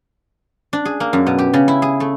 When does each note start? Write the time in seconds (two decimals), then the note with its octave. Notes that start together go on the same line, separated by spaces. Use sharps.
0.73 D4
0.85 G#4
1.00 A#3
1.13 F#2
1.26 B2
1.39 G4
1.53 C#3
1.68 E4
1.82 G#4
2.00 A3